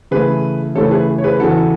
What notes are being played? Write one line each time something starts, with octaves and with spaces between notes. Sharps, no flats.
C#3 E3 A3 G#4 B4
C#3 E3 A3 A4 C#5
G#4 B4
C#5
G#4 B4
E2 C#3 E3 F#4 A4